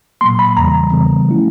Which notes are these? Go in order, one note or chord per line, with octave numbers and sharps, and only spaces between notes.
A#2 F#3 A#3 C6
B5
E2 C#3 E3 G3 A#5
C#3 E3 G3 B3
F3 A3 C#4 E4